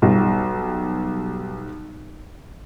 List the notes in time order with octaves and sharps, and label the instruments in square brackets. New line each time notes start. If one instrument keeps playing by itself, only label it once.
[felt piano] B1 G3